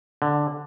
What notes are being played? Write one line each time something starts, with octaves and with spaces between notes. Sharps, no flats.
D3